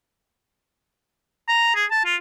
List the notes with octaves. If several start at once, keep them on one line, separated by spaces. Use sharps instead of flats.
A#5
G#4
A5
F4